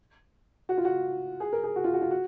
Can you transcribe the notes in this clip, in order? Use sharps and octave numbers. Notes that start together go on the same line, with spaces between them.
F#4
F4
F#4
G#4
A#4
G#4
F#4
F4
F#4
F4
F#4